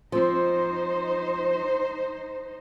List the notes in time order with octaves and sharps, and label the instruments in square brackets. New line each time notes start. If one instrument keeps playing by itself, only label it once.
[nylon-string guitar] F3 C4 [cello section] D#4 C5